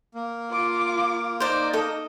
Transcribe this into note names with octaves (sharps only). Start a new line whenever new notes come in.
A#3
F4 D6
D#4 C5 D5
A4 D#5